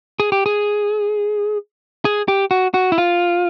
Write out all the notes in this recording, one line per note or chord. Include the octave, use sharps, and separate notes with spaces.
G#4
G4
G#4
G#4
G4
F#4
F#4
E4
F4